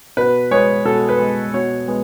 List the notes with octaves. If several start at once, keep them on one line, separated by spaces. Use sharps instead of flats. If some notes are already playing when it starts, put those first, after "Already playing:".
B2 B4
G#3 B3 C#5
B2 A4
B4
G#3 B3
B2 C#5
G#3 B3